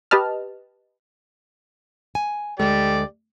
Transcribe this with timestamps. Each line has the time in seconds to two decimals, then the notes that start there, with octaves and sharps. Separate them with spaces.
0.11 G4 B4 D#5 A5 F6
2.15 G#5
2.59 D2 G#3 G4 A4 D5